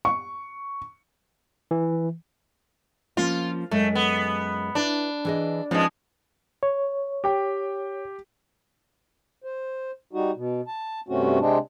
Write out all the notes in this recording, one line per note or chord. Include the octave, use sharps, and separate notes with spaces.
C#6
E3
F3 A#3 C#4 F4
F#2 G#3 A3
B3
D4 E4 B4
E3 G#4 D#5
F3 G#3 C#4 D#4 B4
C#5
G4 G5
C5
G3 D#4 F#4
B2
A5
G2 C3 A3 C4 C#4 F#4
C3 G#3 C4 D4